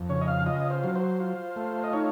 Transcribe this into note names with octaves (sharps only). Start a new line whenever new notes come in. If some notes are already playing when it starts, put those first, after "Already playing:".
Already playing: F2
C#3 C#5
D#5
F5
F4 D#5
C5
F#3
C5
F4
A3
D#5
D#4 C#5